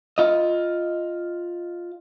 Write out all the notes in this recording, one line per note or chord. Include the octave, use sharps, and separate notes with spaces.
F4 D#5